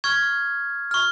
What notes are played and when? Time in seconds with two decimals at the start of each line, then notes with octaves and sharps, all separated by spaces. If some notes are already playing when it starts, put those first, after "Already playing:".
0.04 C#6 F6 G#6
0.91 C#6 F6